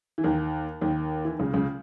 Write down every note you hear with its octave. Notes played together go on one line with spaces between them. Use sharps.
E3
D#2 D#3
D#2 D#3
E3
D#3
C#2 C#3
C#2 C#3